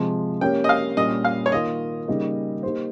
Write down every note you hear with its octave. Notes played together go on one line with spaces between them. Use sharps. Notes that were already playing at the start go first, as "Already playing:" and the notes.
Already playing: C3 F3 G#3
A#3 C#4 G4 C#5 G5
D#5
F5
A#2 G3 C#4 D#5
F5
C#5
D#3 A#3 F4 D#5
C#3 G3 A#3 D#4
A#3 D#4 G4 C5